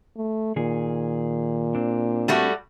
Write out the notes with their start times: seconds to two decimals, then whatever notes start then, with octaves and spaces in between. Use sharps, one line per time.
0.17 A3
0.56 A#2 D#3 G#4
1.75 C4 D4
2.28 G3 A3 F#4